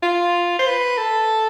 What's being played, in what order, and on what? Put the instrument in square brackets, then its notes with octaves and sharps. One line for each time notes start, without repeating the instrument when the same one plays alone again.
[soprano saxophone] F4
C5
B4
A4